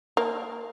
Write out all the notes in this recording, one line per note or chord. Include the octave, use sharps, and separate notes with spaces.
A#3